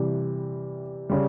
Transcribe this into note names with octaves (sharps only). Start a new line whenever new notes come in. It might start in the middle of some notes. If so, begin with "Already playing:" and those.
Already playing: C3 E3 G3
C#3 G3